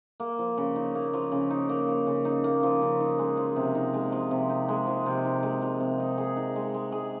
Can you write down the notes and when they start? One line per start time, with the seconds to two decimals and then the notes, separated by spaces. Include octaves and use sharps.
0.20 A#3
0.39 F3
0.58 C#3
0.76 D#4
0.95 A#3
1.13 F3
1.32 C#3
1.50 D#4
1.69 A#3
1.88 F3
2.07 C#3
2.25 D#4
2.44 A#3
2.63 F3
2.82 C#3
3.00 D#4
3.19 G#3
3.37 F3
3.56 C3
3.75 D#4
3.94 G#3
4.12 F3
4.31 C3
4.49 D#4
4.69 G#3
4.87 F3
5.06 C3
5.25 D#4
5.43 G#3
5.61 F3
5.80 C3
5.99 D#4
6.18 G#4
6.37 D#4
6.56 G#3
6.74 G#3
6.92 G#4